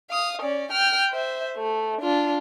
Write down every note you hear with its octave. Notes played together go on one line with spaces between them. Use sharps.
F5 D#6
C#4 D5
G5 F6
C5 E5
A3
D4 F4